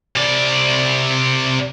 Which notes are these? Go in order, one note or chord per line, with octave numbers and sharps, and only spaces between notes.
C3 D5